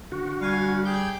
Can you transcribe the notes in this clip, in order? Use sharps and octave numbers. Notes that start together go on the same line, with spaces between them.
D3 F#4
G3 F5 G#5
G4 G#4 G6